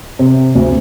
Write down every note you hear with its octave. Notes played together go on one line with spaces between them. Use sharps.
C3
D2